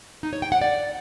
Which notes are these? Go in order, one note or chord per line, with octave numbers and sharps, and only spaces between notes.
D#4
C#5
G5
F#5
D5